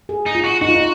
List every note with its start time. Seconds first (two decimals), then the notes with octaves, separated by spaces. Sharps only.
0.09 G#4
0.26 D#4
0.35 F4
0.44 F#4
0.61 D#4 F#4
0.69 F4
0.76 D#4